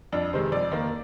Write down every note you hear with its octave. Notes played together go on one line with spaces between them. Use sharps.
F2 D4
C3 D#3 G#3 C5
F2 D5
D#3 A#3